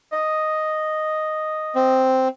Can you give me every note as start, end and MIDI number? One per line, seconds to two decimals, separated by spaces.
0.12 2.13 75
1.75 2.28 60